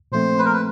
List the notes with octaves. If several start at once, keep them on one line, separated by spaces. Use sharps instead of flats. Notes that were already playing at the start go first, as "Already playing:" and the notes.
A#2 F3 A3 C4 C5
B4
A#4
B4